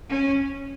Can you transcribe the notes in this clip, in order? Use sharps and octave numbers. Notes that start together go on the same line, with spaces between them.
C#4